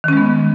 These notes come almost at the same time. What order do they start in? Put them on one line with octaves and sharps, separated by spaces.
D#3 C#4 G#3 B3